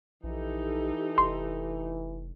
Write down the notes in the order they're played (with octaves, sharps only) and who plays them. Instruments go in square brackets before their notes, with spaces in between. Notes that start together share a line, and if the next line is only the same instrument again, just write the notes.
[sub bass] A#1 [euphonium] E3 [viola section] D#4 G4 A4
[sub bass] F1 [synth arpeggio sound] C6